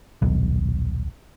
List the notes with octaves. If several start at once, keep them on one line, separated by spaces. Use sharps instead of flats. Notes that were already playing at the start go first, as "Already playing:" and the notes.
D#1 B1